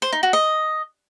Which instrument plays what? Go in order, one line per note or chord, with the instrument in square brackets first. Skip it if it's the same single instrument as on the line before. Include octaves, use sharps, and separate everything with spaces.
[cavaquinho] C5
D#4
F#4
D#5